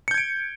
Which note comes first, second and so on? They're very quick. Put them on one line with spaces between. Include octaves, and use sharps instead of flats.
C#7 G6 G#6 D7